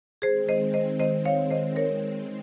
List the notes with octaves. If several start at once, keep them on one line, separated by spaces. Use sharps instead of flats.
D#3 G#3 C4 G#4 C5
C5 D#5
C5 D#5
C5 D#5
C#5 F5
C5 D#5
A#4 C#5